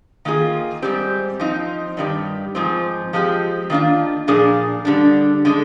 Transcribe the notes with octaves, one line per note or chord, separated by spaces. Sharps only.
D#3 A#3 F4 G#4
G#2 G3 C4 G4
F3 C4 D#4
G2 D#3 G3
G#2 F3 C4
F3 G#3 C4 G4
D#3 A#3 D4 F4
A#2 F3 A#3 D4 G#4
D3 G3 D4
D3 G#3